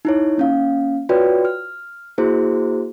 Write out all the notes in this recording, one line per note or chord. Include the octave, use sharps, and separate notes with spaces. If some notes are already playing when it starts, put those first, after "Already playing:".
D#4 E4 C#5
A#3 C#4 F5
F4 F#4 B4 C#5 D5 G5
F6
A#3 E4 F#4 G#4 C5